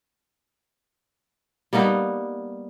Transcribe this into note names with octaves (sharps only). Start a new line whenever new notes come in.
G3 A#3 B3 D#4